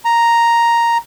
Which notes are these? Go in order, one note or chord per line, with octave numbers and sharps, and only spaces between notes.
A#5